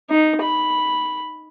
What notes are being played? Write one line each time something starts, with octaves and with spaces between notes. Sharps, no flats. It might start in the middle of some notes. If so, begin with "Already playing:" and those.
D#4
B5